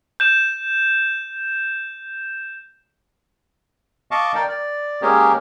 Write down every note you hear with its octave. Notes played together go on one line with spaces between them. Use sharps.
G6 E7
D#5 F5 A5 C#6 D6
A#4 D5 G5
D5
G#3 A#3 C#4 G4 G#4 A#4